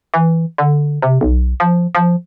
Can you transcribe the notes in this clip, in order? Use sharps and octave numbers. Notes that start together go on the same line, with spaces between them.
E3
D3
C3
B1
F3
F3